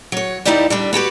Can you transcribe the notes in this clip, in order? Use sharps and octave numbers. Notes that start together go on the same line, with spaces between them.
F#3 C#5
D#2 G3 D#4 E4 G4 D5
D3 G3 D4
B3 F#4 G4 B4